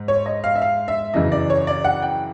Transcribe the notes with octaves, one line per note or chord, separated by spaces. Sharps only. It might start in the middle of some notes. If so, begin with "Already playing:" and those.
Already playing: G#2
C#5
D#5
F5
E5
F5
E5
F#2 C#3 E3 D#5
D5
C#5
D5
F#5
G5